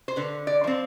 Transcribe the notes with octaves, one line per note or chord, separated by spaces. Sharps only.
C5
D3 B4
D5
F3 C4